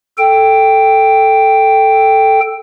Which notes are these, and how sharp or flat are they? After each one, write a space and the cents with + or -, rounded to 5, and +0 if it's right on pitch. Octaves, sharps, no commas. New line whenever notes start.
A4 +0 G5 +0